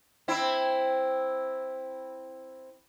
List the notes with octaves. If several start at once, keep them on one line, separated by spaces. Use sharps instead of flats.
C4 E4